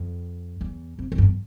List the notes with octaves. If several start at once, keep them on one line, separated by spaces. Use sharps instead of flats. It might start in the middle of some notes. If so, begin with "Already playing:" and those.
Already playing: F2
E2
F2
E2
G2